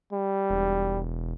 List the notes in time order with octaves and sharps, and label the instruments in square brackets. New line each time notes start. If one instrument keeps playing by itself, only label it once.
[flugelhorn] G3
[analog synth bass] E1